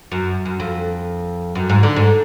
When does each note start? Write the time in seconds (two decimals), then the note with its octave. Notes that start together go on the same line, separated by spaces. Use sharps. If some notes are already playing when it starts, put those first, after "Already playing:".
0.12 F#2
0.46 F#2
0.60 F2
1.55 F#2
1.69 G#2
1.83 D3
1.96 G#2